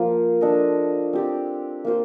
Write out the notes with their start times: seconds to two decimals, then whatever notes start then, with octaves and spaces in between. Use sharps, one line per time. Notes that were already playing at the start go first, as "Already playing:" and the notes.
Already playing: F3 A#3 F4
0.41 D4 A4 D#5
1.13 C4 G4 D5
1.85 A#3 F4 C5